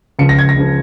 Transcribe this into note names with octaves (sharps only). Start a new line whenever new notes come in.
C#2 C#3 F3 C#7
A#6
G#6
A#6
C#2 C#3 F3